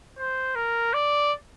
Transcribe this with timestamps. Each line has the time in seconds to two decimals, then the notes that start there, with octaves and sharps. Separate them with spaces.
0.18 C5
0.55 A#4
0.94 D5